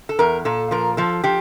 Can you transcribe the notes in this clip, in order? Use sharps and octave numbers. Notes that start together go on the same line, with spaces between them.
A4
E2 A#4
A#2 A4
F3 A#4
F3 A4
F3 G4